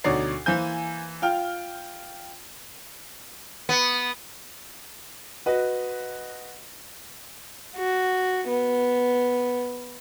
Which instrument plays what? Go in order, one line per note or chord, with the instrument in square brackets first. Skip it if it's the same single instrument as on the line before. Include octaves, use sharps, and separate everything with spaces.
[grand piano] D2 B2 D#4 C#5 D5 C7
E3 A#3 C5 G#5 G6
F4 G5 F6
[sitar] B3
[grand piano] F#4 B4 D#5
[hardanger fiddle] F#4
B3